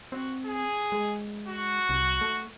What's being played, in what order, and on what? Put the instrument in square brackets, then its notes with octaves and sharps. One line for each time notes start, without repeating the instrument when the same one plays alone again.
[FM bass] C4 [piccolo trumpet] F#4
[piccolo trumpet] G#4
[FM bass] G#3
[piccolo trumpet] F#4
[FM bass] C2
A3